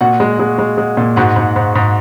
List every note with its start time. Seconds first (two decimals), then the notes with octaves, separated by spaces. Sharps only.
0.01 A#2 F#4 F#5
0.20 G#3
0.39 G#3
0.59 G#3
0.78 G#3
0.97 A#2
1.16 G#2 F#4 F#5
1.36 G#2
1.56 G#2
1.75 G#2